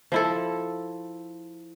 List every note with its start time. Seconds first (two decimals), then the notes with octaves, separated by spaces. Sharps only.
0.12 F3 E4 A4